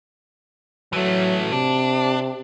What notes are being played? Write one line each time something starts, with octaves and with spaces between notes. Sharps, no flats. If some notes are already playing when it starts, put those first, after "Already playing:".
E3 F#3 A3
C3 D4